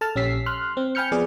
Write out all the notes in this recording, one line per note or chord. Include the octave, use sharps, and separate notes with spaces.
A4 A5 F6
A#1 C#4 G4 E6 B6 C7
C6 F6 F#6
C4
G5 G#5 B5 F6 G6 C#7
F3 B3 G#4 D5